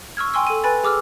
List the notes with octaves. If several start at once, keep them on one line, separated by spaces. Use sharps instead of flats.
C#6 E6 F6 G#6
G5 G#5 C6 C#6 E6
A4 D#7
B4 G#5 B5 A6
G#4 D6 E6 F6